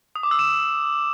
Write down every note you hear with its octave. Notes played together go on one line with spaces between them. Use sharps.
D#6
D6
E6
E7